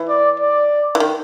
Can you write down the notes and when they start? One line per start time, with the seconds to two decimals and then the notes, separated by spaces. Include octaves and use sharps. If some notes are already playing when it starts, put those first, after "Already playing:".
Already playing: E3
0.09 D5
0.40 D5
0.95 E3
1.00 D#3